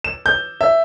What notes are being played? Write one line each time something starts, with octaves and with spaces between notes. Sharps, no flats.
E7
G6
E5